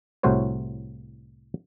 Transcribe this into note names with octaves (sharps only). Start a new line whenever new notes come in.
C2 A2 F#4 C5 C#5